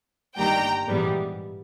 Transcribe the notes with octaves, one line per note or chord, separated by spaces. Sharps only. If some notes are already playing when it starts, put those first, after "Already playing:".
G1 G2 D#3 G3 A#3 G5 A#5
A#1 G#2 E3 G3 B3